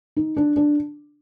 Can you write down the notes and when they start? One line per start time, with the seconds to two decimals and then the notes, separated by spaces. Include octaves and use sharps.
0.16 D#4
0.37 D4
0.56 D4